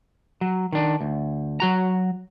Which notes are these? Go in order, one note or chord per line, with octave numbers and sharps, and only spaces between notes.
F#3
D#3 D4
D2
F#3 F#4 A#5